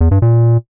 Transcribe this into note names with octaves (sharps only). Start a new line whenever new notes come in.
E2
G2
A#2